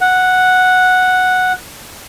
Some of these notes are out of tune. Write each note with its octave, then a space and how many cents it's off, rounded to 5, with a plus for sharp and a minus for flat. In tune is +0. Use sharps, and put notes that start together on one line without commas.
F#5 -5